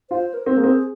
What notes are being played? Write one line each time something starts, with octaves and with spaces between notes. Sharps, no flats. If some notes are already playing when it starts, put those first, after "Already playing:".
F4 C5
A#4
C4
A#3 G#4
C4